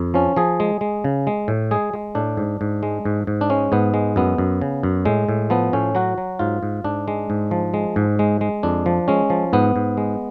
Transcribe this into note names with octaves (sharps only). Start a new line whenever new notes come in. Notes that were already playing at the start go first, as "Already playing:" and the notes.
Already playing: F2
F3 C#4
F3 G#4
G#3
G#3
C#3
G#3
A2
G#3 G#4
G#3
A2 D4
G#2
G#2
G#3
G#2
G#2
D4
G#3 C#4
G#2 B3
G#3
F#2 B3
F#2
C#3
F#2
A2 G#3
A2
F3 B3
A2 C#4
F#3 F#4
F#3
G#2 F4
G#2
G#2 D4
G#3
G#2
F3
G#3
G#2
G#3
G#3
F2 D4
F3
G#3 C#4
F3
G#2 B3
G#2
G#3